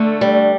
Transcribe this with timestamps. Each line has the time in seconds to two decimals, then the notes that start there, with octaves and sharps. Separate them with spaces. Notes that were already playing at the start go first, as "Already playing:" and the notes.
Already playing: D3 A3
0.21 G3